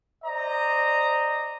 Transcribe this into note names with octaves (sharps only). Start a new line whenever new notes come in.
C5 D5 D#5 A#5